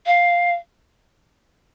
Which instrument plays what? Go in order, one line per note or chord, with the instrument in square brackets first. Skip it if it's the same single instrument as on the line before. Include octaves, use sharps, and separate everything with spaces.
[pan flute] F5